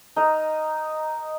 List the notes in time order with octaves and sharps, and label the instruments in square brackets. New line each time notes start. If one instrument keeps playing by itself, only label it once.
[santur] D#4 A#4